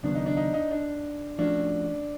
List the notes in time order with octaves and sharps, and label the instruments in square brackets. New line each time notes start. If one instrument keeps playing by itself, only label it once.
[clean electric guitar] D#2 C#3 F#3 B3 [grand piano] D4
[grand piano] D#4
D4
D#4
D#4
D4
[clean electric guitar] F3 A3 C#4 F#4 [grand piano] D4